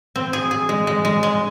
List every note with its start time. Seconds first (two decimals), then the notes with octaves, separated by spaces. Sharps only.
0.16 C4
0.33 G#4
0.51 G#4
0.69 G#3
0.87 G#3
1.05 G#3
1.23 G#3